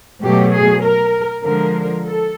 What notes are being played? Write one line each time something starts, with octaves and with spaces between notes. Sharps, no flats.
B2 F#3 A3 G4
G#4
A#4
D3 F3 G#3 A#4
A4